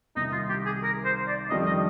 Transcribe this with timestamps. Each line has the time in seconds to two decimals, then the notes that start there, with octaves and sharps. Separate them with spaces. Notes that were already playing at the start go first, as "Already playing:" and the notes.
0.16 C2 C3 D#3 D#4
0.33 F4
0.49 G4
0.66 G#4
0.83 A#4
1.05 C5
1.27 D5
1.49 F2 D#3 G3 D4 D#5
1.66 D#5